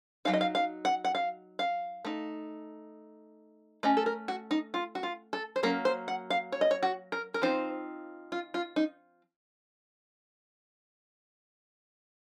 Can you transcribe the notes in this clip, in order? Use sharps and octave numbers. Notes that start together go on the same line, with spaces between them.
F#3 C4 D#4 F5
D#5
F5
F5
F#5
F#5
F5
F5
A3 D#4
A3 C#4 D#5
A4
A#4
F#4
D#4
F4
F#4
F4
A4
C5
F#3 A#3 C#4 A#4
C5
F#5
F5
C#5
D#5
C#5
F#4
A#4
A#4
F3 C4 D#4 C5
F4
F4
D#4